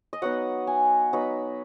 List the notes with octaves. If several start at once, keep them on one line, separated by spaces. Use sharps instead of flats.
D#5
F#3 B3 D#4 F#5
G#5
F#3 B3 D#4 B5